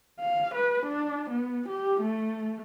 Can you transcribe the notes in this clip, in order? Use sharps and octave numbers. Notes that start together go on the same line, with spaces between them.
F5
B4
D4
B3
G4
A3